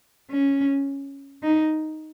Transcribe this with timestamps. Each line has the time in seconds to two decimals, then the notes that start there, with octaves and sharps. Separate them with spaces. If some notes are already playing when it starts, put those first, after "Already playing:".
0.31 C#4
1.43 D#4